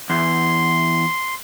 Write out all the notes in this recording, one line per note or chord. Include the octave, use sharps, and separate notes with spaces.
E2 C6